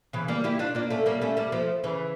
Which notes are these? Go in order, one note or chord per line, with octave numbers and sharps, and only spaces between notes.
C#3 E3
G3 A#3
E4 G4
D4 F4
A#3 D4
A3 C#4
G3 A#3
A3 C#4
G3 A#3
F3 A3
C#3 E3